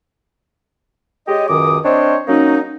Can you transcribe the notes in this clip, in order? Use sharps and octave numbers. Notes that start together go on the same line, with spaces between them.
G#3 G4 C#5 D#5
C#2 F#2 D#3 D6 D#6
C4 D4 C5 C#5 D#5
F#3 A#3 C#4 D#4